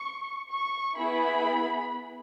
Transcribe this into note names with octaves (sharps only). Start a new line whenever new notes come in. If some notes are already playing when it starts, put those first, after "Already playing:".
Already playing: C#6
C#6
B3 E4 G#4 B5